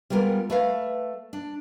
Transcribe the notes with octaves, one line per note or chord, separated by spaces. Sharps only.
G3 G#3 B3 F4 A#4
A3 B4 F5
D4